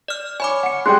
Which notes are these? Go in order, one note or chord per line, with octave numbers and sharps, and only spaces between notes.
D5 F6
C#5 G#5 B5 D6
F#5 C#7
G3 G#3 G5 C6 F#6